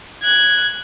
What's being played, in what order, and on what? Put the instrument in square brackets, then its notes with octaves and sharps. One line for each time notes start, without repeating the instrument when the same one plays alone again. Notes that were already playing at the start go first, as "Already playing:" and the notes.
[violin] F#6 G#6